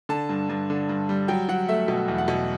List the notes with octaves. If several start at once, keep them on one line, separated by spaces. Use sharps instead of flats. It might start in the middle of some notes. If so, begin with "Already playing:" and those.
D3 A5
G2
G2
D3
G2
G3
F#3 G5
F#3 F#5
A3 E5
B2
E2
F#5
B2